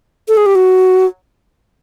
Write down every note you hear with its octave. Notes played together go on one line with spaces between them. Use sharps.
A4
G#4
G4
F#4